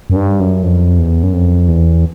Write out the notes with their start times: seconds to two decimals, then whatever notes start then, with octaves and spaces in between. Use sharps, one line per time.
0.10 F#2
0.16 G2
0.40 F#2
0.63 F2
0.98 E2
1.23 F#2
1.33 F2
1.68 E2